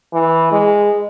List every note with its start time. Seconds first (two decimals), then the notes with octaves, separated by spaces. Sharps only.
0.13 E3
0.51 G#3